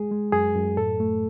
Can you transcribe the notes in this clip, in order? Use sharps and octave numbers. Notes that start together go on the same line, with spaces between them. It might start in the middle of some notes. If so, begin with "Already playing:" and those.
Already playing: G#3 G#4
G#3
F#2 G#4
F#2
A2 A4
A3